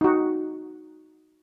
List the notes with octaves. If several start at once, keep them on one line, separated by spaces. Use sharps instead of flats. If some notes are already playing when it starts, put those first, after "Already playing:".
D#4 F#4